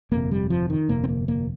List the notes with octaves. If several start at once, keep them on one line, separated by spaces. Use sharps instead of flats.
G1 F2 C3 A#3
G3
F3
D#3
G1 F2 C3 A#3
C4
A#3
A#3